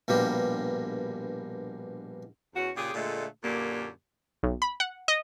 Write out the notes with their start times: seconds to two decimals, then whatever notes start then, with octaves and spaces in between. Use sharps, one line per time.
0.08 A#1 G2 B2 A#3 G4
2.55 E2 C#4 F#4
2.76 A#2 C#3 G4 G#4
2.94 A#2 D3 G#3 A3
3.42 F#2 A#2 D3 A#3 G4
4.43 B1
4.62 B5
4.80 F#5
5.08 D#5